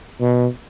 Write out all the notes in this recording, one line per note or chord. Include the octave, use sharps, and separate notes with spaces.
B2